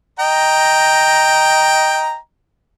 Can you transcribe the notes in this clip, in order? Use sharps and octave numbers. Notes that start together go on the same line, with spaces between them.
D#5 G5 A#5